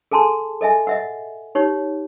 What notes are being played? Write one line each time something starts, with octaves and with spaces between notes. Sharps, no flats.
G#4 A4 G#5 A5 C6
A4 D#5 E5 G#5
D#5 E5 F#5
D#4 G4 C#5